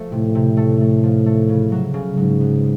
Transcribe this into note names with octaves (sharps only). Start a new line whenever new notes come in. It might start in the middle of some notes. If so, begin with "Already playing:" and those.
Already playing: F3 A3
A2 C3
C3
A3
A3
F3
A3
C#3
F#3
C#3
G#2 F#3
B3